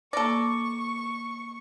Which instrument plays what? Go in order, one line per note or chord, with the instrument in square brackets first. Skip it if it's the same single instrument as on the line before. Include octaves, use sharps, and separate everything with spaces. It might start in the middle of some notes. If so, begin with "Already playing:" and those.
[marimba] A#3 A#6 [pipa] A4 D5 [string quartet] C#6